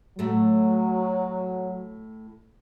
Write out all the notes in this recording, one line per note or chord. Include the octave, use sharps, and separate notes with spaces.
A2 F#3 A3